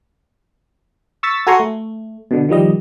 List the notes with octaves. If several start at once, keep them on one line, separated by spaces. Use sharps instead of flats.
C#6 E6 A6 B6
F#4 A4 G#5 A#5 C6 C#6
A3
B2 D3
D#3 F3 G3 D#5